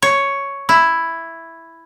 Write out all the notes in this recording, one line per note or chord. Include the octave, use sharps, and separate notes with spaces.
C#5
E4